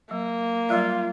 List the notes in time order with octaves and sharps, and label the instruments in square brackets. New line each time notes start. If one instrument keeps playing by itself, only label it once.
[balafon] F#3 [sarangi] A#3
[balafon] F#3 G3 D5 [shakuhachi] F4